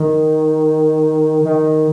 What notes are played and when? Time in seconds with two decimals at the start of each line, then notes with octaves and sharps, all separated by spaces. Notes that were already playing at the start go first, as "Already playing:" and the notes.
Already playing: D#3
1.45 D#3